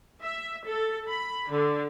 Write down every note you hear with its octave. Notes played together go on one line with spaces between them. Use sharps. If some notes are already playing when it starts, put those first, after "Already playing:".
E5
A4
B5
D3